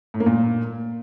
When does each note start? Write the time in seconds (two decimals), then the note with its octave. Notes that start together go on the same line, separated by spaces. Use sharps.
0.14 A2
0.20 A#3
0.26 A#2